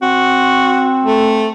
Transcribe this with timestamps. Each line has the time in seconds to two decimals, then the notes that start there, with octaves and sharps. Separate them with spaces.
0.02 C4 F#4
1.04 A3